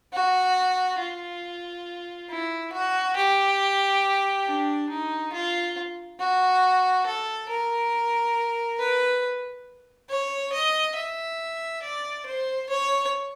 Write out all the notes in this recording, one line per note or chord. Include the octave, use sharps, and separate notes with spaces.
F#4
F4
E4
F#4
G4
D4
D#4
F4
F#4
A4
A#4
B4
C#5
D#5
E5
D5
C5
C#5